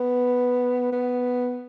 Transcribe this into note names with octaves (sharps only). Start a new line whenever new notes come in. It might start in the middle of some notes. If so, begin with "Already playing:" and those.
Already playing: B3
B3